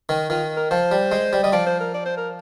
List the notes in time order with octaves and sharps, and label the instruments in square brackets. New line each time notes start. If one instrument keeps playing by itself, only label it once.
[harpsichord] D#3
[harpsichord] D#3 [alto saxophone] F4
[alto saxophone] A#4
[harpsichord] F3 [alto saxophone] C5
[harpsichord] G3
G#3
G3
[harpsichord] G3 [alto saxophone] D#5
[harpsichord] F3 [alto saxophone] D5
[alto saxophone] C5
A#4
D5
C5
A#4